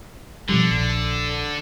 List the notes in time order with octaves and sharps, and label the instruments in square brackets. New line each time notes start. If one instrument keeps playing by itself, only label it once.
[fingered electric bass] B2 F3 G3 [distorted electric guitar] D3
[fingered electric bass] A#1